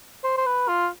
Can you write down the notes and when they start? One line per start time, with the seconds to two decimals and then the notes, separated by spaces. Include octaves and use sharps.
0.24 C5
0.37 C5
0.46 B4
0.68 F4